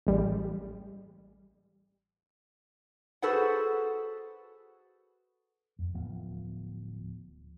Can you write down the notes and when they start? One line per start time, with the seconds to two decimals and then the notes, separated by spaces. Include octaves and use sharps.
0.07 A1 G3
3.22 F#4 G#4 A4 B4 C5 F#5
5.79 F2
5.94 D1 F3 B3